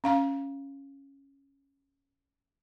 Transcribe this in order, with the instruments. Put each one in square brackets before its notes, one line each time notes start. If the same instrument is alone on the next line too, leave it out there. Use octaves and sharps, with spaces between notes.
[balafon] C#4 F5 A#5